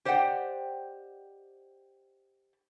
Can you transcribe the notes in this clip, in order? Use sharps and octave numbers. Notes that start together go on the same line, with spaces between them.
G4 C5 D5 D#5 F#5 G5